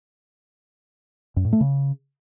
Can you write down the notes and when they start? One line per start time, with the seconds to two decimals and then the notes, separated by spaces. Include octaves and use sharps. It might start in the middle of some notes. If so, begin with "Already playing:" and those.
1.36 F#2
1.45 A2
1.53 A3
1.61 C#3